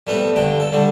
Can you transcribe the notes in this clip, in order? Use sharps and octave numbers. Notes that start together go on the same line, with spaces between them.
G3 A3 B3 C4
G2 D3 G5
A4
D3 G3 A3